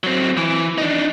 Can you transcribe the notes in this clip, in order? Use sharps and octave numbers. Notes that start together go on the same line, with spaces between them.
F#3 C4
E3
D4 D#4